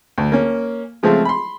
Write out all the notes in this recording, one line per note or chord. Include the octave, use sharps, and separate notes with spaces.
D2
A#3 C#4
C#3 F3 G#3 A3 C4
B5 C6